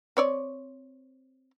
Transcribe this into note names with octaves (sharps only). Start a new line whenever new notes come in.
C4 C#5 D5